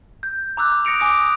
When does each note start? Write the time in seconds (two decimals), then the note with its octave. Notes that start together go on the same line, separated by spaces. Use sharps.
0.23 G6
0.57 A#5 D6 E6 F#6
0.71 F#6
0.85 D#6 A#6 C#7 D7 F7
1.00 G#5 D6 D#6 A#6